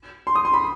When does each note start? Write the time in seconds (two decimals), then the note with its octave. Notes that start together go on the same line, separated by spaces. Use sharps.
0.27 C6
0.35 D#6
0.45 C6
0.53 B5